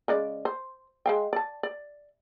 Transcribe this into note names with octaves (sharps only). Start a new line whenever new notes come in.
C#3 G#3 D5
C5
G#3 F5 G5
D5 A5
D5